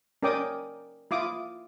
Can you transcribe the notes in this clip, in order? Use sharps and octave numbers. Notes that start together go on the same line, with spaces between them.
C#4 A#4 D5 G5 D6 D#6
E4 F4 D6 D#6